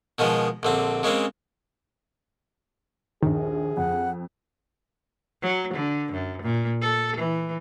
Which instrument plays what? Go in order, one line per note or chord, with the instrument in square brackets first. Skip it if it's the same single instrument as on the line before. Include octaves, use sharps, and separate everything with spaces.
[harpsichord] B2 D#3 F3 G#3
A#1 D3 C4
C#3 G#3 A#3 C4
[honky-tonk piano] A#1 D#2 [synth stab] D#3 [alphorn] G#4
[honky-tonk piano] F2 [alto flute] F#5
[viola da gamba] F#3
D3
F#2
A#2
A4
E3